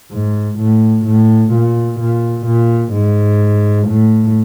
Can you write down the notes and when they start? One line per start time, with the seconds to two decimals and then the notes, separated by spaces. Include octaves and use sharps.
0.12 G#2
0.58 A2
1.05 A2
1.52 A#2
2.00 A#2
2.46 A#2
2.93 G#2
3.87 A2